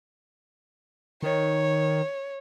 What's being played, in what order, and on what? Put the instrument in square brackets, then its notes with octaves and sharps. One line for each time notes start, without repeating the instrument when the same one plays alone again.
[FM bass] D#3 [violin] C#5